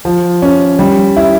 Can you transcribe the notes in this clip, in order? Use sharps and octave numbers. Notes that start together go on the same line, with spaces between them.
F3
C#4
G3
E4